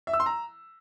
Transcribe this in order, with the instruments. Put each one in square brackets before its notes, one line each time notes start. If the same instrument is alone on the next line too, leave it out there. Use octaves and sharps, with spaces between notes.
[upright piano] E5
E6
C6
A#5